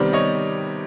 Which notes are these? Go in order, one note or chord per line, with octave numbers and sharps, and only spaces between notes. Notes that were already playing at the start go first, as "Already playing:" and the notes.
Already playing: C3 D#3 G3 B3 C5 D5
C#5 D#5